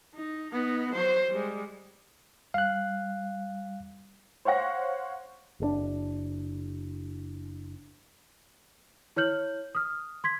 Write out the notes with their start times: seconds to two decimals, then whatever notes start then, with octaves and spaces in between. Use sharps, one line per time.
0.15 D#4
0.52 B3 D#4
0.93 F#3 C5
1.31 G3 G#3
2.54 G3 F5 F#6
4.45 C5 C#5 F5 F#5 A#6
5.60 F#1 B2 D4
9.16 E4 C#5 F6 G6 F#7
9.75 D#6 F6
10.24 C6 G#6 B6